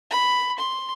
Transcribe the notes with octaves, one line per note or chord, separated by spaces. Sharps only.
B5
C6